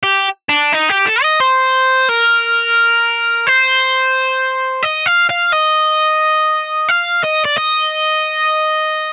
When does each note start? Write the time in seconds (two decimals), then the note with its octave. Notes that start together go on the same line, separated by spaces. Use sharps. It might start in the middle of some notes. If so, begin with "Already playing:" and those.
0.03 G4
0.49 D4
0.73 D#4
0.90 G4
1.06 A4
1.23 D#5
1.40 C5
2.09 A#4
3.47 C5
4.83 D#5
5.06 F5
5.29 F5
5.52 D#5
6.89 F5
7.23 D#5
7.45 D5
7.57 D#5